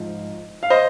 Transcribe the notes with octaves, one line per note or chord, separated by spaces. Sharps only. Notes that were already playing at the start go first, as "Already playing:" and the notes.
Already playing: G#2 F3
F5
C5 D#5